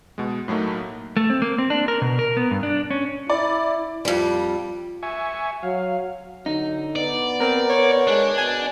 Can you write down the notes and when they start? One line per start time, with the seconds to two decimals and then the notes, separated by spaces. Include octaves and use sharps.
0.18 B2 G#3
0.48 A2 F#3 A3 A#3 D#4
1.17 A3
1.30 C4
1.42 A#3
1.58 C4
1.70 D4
1.88 A#4
2.02 B2
2.19 A#4
2.37 B3
2.51 G2
2.63 D4
2.91 C#4
3.30 E4 D5
4.05 F2 G3
5.03 E5 G#5 C#6
5.63 F#3 F5
6.46 D3 F#3 D#4
6.96 B3 D5
7.40 C4 A#4
7.70 C#5
8.07 G#3 D4
8.38 B2 G#5